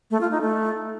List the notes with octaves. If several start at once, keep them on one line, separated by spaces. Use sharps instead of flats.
A3
F4
D#4
A3